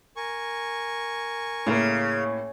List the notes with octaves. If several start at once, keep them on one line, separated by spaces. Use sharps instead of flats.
A#4 G#5 C#6
A2 C#3 A#3